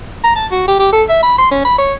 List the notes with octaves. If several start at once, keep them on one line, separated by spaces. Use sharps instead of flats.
A#5
A5
F#4
G4
G4
A4
E5
B5
C6
C#4
B5
C#5